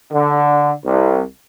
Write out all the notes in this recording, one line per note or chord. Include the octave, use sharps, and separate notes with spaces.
D3
C2